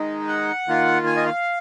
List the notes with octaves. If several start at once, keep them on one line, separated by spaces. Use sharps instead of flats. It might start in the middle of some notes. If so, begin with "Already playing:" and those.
Already playing: D#3 G#3 D#4
F#5
D#3 A#3 F4
G#5
D#5
F5